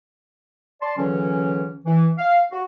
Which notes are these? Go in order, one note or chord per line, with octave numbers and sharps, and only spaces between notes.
D5 A5 C6
C#2 D3 E3 F#3 C#4
E3
F5
F#4